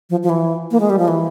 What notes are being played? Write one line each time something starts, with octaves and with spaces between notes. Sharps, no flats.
F3
F3
E3
A#3
G#3
G3
F3
E3